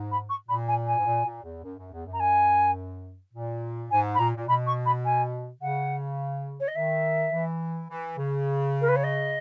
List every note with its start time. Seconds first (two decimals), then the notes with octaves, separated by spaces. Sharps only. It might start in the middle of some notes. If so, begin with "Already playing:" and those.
Already playing: G#2
0.11 B5
0.29 C#6
0.48 A#2 B5
0.68 G#5
0.86 G#5
0.97 G#2
1.06 A#2
1.24 A#2
1.43 E2
1.63 F#2
1.77 F#2
1.92 E2
2.06 F#2
2.13 A#5
2.19 G#5
3.33 A#2
3.91 G#2 G#5
4.14 B5
4.19 A#2 A#5
4.35 A#2
4.47 B2 B5
4.66 C#6
4.85 B5
5.05 G#5
5.61 C#3 F#5
6.60 C#5
6.68 D#5
6.75 D#3 E5
7.32 E3
7.89 E3
8.17 C#3
8.81 A#4
8.88 B4
8.96 C#5
9.03 D#5